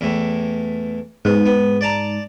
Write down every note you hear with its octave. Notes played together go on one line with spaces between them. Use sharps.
E2 A2
G#2 B3
B3
D5 A5 A#5